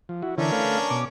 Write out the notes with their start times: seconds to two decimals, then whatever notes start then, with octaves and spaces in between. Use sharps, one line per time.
0.09 F3
0.22 E4 F#4
0.38 D3 E3 C#4 D4 E4 A#4
0.52 A3 B4 F5
0.90 B2 D6